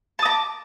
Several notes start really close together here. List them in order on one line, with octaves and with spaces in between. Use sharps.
A5 D#6 A#5 D6